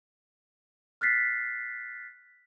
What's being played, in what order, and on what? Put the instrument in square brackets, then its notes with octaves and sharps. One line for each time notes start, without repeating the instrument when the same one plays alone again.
[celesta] F6 F#6 A6 B6 C7